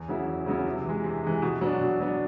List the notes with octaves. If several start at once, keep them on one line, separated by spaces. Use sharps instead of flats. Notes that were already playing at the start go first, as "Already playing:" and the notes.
Already playing: E2
C#3 F#3 B3 E4
E2
C#3 F#3 B3 E4
C3
E3 G#3
C3
E3 G#3
B2
F#3 B3 D4
B2
F#3 B3 D4